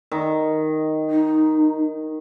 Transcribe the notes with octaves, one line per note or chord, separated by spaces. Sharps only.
D#3
D#4